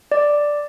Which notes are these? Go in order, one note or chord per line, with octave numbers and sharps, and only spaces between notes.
D5